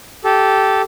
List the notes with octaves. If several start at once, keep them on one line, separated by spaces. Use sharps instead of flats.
G4 A4